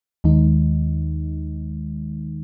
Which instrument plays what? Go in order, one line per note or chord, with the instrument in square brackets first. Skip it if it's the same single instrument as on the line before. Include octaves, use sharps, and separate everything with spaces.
[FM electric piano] D#2 D#3 G#3 D#4